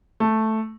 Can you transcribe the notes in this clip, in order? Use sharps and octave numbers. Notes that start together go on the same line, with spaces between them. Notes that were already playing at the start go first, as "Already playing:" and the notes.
A3